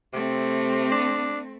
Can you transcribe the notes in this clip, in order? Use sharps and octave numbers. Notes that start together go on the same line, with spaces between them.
C3 A3 C4
D4